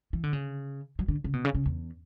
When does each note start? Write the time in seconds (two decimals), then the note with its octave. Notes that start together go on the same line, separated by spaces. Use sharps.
0.13 E3
0.24 D3
0.33 C#3
0.99 F#3
1.08 D3
1.24 C#3
1.33 B2
1.45 C#3
1.55 C#3
1.66 E2